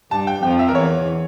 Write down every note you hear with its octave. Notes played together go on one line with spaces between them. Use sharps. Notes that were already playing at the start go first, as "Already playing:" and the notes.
G2 G3 A5
G5
F2 F3 G5
E5
A#4
E2 E3 C#5